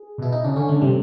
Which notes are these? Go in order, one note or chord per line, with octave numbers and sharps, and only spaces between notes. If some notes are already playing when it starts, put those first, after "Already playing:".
Already playing: G#4
B2
E4
D#4
C#3 D4
D3 C#4
D3 A3
C3 G3